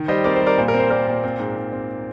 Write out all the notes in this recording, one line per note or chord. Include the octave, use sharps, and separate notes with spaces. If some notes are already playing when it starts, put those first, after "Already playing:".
Already playing: D#3
G3 C5 D#5
C4 A#4 D5
C5
G3
A#4 D5
A#2 C5
A#4
C4
C5
C4 A#4 D5
A#2
C4
G#2
G#2
C4